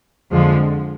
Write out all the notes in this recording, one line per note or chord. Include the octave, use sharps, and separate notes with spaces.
F2 D3 F3 G#3